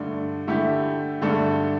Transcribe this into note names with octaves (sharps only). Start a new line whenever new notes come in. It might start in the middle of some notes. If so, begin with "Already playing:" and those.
Already playing: G2 D3 A3 D4
D3 A3 E4 G4
G2 D3 A3 D4 A4